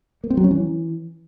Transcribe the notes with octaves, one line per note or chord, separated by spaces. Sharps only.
A#3
C4
F#3
C#4
E3